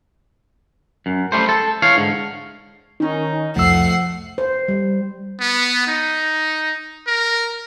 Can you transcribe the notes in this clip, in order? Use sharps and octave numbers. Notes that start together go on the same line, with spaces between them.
F#2
G3 A3 C5
A4 A5
E3 C#5 F5
G#2 D3
D#3 C#4 D#4
C2 F2 F3 A3 F#5 E6 C7
C5
G3
B3
D#4
A#4